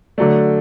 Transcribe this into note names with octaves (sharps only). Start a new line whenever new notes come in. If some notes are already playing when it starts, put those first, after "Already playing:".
D3 F#3 A3 D5